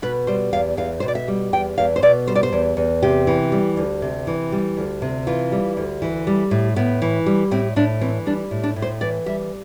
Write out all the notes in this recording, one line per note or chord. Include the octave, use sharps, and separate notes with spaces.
B2 B4
G3 C5
E2 F5
E2 F5
B2 C5
D5
E5
G3
E2 G5
E2 F5
C5
B2 D5
G3 C5
D5
C5
E2
E2
C3 G4
E3
G3
D2
C3
E3
G3
D2
C3
E3 F4
G3
D2
E3
G3
A2
A2 B3
E3
G3
A2 C4
A2 D4
E3 C4
G3 D4
A2
D4
A2
C5
E3 D5
G3 E5